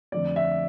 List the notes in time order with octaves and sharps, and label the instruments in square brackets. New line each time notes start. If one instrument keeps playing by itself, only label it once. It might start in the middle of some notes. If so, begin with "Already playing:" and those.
[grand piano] F2 D3 F3 A3 D5
E5